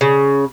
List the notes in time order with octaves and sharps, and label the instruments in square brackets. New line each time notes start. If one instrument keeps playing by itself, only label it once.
[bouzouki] C#3